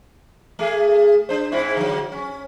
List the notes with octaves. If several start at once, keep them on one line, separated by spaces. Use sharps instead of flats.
A3 G#4
D4 C5
G#2 C4 E4
D3 F#3
C#4